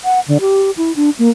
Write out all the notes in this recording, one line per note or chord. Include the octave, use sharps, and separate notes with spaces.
F#5
D3
G4
E4
D4
A#3